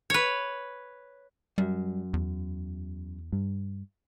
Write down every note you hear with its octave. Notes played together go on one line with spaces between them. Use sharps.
B4 C#5
F#2 G3
E2
G2